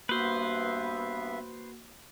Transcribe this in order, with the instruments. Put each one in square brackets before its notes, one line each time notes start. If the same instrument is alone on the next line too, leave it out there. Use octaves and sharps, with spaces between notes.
[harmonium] G2 B3 E5 [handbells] A#3 F#4 [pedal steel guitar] B4 C5